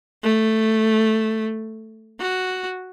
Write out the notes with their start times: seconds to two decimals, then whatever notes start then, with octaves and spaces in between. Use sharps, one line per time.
0.23 A3
2.19 F#4